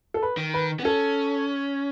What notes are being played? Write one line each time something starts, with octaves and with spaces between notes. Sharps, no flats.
A4
B4
D#3
B4
B3
C#4 A4